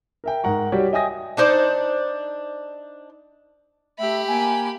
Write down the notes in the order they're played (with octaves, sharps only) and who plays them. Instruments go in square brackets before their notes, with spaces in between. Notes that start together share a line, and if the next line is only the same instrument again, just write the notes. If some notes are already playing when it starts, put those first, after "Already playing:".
[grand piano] A#4 E5 G5
G#2 A#4 F#5 A#5 C#6
G3 F#4 G4 C#5
D#5 E5 G5 G#5 D#6 A#6
[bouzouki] D4 D#4 C5 D5
[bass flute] A3 [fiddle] G4 B5 [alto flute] E5
[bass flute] A#3 [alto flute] G#5